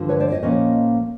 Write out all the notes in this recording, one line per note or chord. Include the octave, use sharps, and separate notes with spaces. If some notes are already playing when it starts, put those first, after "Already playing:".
Already playing: G2 D3 F3
B4 C#5
C5 D5
C#5 D#5
A#2 F3 A#3 C#4 C#5 D#5